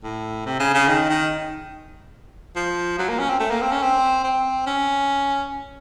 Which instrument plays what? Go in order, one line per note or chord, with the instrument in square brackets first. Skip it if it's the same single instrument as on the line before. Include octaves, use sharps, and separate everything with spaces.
[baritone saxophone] A2
C3
C#3
C#3
D#3
D#3
F3
F#3
A#3
C#4
C4
A3
A#3
C4
C#4
C4
C4
C#4